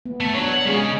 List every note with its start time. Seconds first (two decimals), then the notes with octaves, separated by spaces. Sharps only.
0.06 B3
0.21 A3
0.35 F#3 D4 C#5
0.52 F#5
0.65 C#3 G#3 G#4